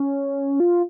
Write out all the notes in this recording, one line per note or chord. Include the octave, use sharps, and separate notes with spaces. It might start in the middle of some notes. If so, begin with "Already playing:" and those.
Already playing: C#4
F4